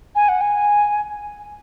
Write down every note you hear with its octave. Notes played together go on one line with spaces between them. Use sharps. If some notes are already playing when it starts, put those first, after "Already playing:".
G#5
F#5
G#5